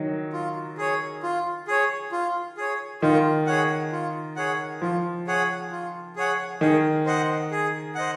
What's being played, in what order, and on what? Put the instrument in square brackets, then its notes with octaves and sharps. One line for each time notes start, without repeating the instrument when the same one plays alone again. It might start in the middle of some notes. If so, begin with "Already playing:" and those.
Already playing: [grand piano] D#3 F#3
[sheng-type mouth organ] F4
G#4 C#5
F4
G#4 C#5
F4
G#4 C#5
[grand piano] D#3 [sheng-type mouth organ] F4
[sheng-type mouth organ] G#4 C#5 F#5
F4
G#4 C#5 F#5
[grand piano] F3 [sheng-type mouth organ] F4
[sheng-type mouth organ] G#4 C#5 F#5
F4
G#4 C#5 F#5
[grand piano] D#3 [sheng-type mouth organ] G#4
[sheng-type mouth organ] C5 D#5 F#5
G#4
C5 D#5 F#5